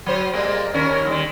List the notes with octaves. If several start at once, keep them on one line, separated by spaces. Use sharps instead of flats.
F#3 C5
G3 G#3 A#3
D#2 C#4 A#4
D#3 G3